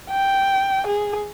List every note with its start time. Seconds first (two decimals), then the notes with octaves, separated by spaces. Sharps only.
0.10 G5
0.87 G#4